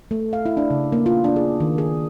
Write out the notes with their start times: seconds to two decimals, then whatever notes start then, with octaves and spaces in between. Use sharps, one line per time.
0.11 A3
0.33 F5
0.46 E4
0.57 D4
0.70 C#3
0.92 A#3
1.06 F4
1.24 D4
1.36 G#4
1.60 D#3
1.78 G#4